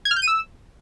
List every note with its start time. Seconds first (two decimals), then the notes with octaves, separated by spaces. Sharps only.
0.05 G#6
0.11 F6
0.16 G6
0.22 D#7
0.27 E6